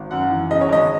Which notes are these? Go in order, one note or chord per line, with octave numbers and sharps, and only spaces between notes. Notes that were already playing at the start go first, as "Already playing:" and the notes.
Already playing: G#1
F#2 F#5
E3
C#3 D#5
C#5
G#1 D#5